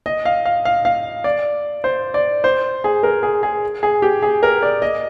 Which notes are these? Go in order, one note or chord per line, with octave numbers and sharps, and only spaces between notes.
D#5
F5
F5
F5
F5
D5
C5
D5
C5
G#4
A#4
G#4
G#4
G#4
G4
G#4
A#4
D5
D#5